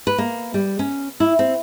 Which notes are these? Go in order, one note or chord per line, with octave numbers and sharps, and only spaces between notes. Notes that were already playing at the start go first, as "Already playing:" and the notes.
B4
A#3
G3
C#4
E4
C4